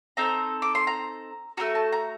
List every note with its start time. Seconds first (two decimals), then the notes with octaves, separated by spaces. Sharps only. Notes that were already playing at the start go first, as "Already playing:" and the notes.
0.17 C4 D#4 A4 A#5
0.62 D6
0.75 C6
0.87 A#5
1.57 A3 C4 F#4 A#5
1.75 A5
1.92 A#5